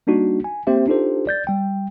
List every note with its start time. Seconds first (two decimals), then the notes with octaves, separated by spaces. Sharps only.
0.07 G3 A#3 D4 D#4 F#4
0.44 G#5
0.67 A#3 C4 G4 C5 E5
0.87 D4 D#4 F4 G4 A4 C5
1.27 D5 G6 A6
1.47 G3 G5